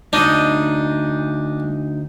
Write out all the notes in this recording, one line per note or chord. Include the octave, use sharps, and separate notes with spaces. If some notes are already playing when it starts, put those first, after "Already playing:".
D2 D4 D#4 D#5